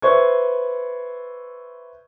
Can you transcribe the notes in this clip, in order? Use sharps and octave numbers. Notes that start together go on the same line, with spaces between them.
B4 C5 D5 E5 C#6 G#6